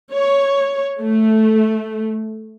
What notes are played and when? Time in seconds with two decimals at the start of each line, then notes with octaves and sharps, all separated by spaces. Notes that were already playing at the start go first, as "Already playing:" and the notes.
0.13 C#5
1.02 A3